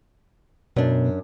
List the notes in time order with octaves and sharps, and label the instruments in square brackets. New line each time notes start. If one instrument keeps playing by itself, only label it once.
[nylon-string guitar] F#2 D4 [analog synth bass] B2